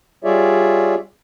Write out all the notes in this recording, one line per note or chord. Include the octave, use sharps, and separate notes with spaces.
G3 F4 G#4 C#5 D5 E5